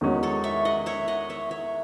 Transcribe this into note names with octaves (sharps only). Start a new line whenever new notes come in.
E2 D#3 G#3 C#4 F#4
A4 C#5
C#5 E5
D#5 F#5
C#5 E5
D#5 F#5
C#5 E5
C#5 E5